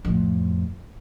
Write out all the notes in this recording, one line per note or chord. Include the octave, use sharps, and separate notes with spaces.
F2 A2